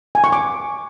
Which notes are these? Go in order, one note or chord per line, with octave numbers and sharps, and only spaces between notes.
G#5
C#6
D6